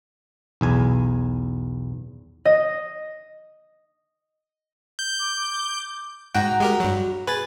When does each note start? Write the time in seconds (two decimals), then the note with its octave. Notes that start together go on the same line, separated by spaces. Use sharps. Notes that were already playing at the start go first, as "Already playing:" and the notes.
0.61 B1 E2 G#5
2.45 D#5
4.99 G6
5.20 D6
5.36 D6
6.35 G#2 F#4 G5 A#5
6.60 G#3 G4 A#4
6.80 G2 F#3
7.27 G#4 B4 A6